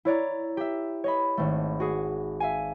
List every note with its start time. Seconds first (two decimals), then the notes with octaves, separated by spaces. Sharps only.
0.05 E4 C#5 D5 A#5
0.57 G4 E5
1.04 C#5 D#5 B5
1.37 G#1 A3
1.80 F#4 G#4
2.40 E5 F5 G#5